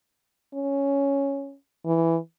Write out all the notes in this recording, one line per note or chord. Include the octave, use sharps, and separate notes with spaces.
C#4
E3